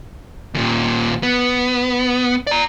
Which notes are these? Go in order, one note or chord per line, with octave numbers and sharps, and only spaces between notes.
D#2 A#2
B3
D5 A#5